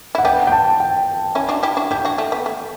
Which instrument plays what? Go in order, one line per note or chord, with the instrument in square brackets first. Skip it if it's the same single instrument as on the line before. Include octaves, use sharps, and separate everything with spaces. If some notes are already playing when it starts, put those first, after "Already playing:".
[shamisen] E4 [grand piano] F#5
[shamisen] B3 D4 [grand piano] G5
[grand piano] G5
A5
G5
[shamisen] C#4 E4
D4 F#4
E4 G4
D4 F#4
[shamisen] E4 G4 [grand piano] G5
[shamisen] D4 F#4
A3
B3
A3